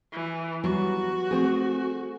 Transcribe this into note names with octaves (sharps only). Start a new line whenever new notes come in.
E3
F#3 G3 B3 F#4
A3 C4 G#4